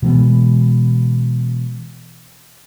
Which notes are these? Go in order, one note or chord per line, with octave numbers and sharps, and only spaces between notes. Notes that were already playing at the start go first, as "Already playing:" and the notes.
B2 E3 G#3 B3